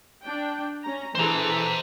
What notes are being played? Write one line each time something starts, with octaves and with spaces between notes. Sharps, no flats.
D4 G5
C#4 A#5
E3 G#4 A4 C5 A#5